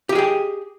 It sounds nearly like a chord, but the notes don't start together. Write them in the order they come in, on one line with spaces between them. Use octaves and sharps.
G4 D#5 G#4 G5